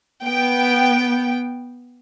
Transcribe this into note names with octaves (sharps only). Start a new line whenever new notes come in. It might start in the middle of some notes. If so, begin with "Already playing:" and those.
B3 G5